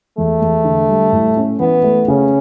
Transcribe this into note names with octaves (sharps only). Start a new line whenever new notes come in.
E2 A3
E2
D3
G3
A2
C#4
E3 B3
A3
C#3 C#4